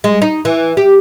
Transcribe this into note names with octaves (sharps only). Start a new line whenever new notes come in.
G#3
D#4
E3
G4